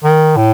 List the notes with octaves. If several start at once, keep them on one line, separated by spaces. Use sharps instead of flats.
D#3
A2